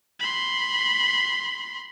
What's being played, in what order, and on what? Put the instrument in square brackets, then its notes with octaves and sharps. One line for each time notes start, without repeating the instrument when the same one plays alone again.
[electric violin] B5 C6